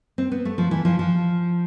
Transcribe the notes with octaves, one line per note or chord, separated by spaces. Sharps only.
C4
B3
A3
F3
E3
F3
F3